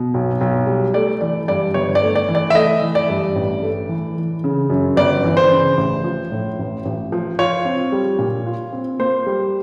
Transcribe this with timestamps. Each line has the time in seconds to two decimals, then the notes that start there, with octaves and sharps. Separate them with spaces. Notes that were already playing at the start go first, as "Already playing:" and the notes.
Already playing: B2
0.14 B1
0.41 B1
0.67 G3
0.94 A3 D5
1.21 E3 D5
1.48 G2 D5
1.74 G1 C#5
1.95 D5
2.02 A3
2.15 D5
2.28 E3
2.35 D5
2.50 E5
2.55 A3 D#5
2.82 E3
2.95 D5
3.10 G2
3.36 A1
3.62 A3
3.89 E3
4.17 E3
4.44 C#3
4.70 F#2
4.97 G1 D5
5.24 E3
5.37 C5
5.51 C#3
5.77 A1
6.04 F3
6.32 A2
6.59 A1
6.85 A1
7.12 F3
7.39 F4 C#5
7.65 C4
7.92 G3
8.19 A#2
8.46 F4
8.73 C4
8.99 A#3 C5
9.26 G3